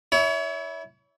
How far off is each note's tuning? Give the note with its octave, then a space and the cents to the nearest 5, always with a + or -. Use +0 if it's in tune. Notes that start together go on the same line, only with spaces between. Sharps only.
E4 -15 C#5 +35